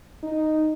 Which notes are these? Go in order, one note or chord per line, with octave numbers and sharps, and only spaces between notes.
D#4